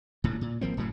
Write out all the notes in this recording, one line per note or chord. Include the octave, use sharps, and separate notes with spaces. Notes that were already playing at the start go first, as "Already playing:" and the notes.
D#1 D2 A2
A#2
G#1 F3 A#3 C4
F#1 A2 C#3 F#3